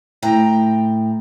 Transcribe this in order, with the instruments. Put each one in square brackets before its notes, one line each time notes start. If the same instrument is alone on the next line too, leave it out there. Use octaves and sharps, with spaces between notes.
[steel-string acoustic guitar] A2 G5 A#5